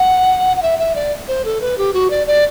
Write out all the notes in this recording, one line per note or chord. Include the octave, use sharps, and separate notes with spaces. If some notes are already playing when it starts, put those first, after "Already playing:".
Already playing: F#5
F#5
E5
E5
D5
C5
A4
B4
G4
F#4
D5
D5